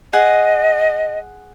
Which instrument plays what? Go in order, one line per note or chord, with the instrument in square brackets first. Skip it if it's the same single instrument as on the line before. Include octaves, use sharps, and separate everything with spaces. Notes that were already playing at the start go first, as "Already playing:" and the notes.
[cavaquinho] G#4 F#5 [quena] D#5